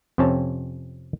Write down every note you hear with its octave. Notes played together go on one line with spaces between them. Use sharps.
F2 C3 C4 C#4 C#5 A5